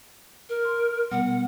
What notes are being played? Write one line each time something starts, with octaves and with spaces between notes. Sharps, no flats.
A#4
C6
B2 G3 B3 F#5